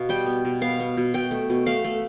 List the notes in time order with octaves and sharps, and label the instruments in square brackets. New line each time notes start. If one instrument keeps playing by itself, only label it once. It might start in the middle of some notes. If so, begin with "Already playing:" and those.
Already playing: [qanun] B2 B3 F5
G3 G5
B3
B2
B3 F5
B3
B2
B2 G5
A3
B2
A3 F5
A3